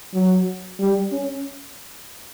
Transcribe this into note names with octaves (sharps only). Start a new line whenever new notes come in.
F#3
G3
C#4